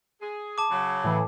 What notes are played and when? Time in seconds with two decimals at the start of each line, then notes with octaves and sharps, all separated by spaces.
0.21 G#4
0.58 A5 D6
0.71 C#3 F#3
1.04 A2 E3